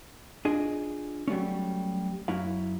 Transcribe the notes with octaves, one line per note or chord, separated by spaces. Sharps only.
D4 F4 G#4 D#5
F#3 G3 A3 C#4
F#2 F#3 E4 F5